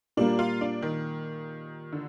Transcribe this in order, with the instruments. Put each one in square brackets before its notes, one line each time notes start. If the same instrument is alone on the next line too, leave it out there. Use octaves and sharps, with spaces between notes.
[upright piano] A#2 G3 A#3 [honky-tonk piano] D4
[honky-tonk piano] F4
D4
D#3
D3